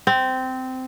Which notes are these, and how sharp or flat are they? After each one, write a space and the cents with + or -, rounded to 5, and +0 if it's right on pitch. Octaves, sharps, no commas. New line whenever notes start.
C4 -15